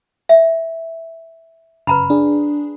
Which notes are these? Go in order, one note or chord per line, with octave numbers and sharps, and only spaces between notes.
E5
G1 F#2 C#3 B4 A#5 B5
D4 G#4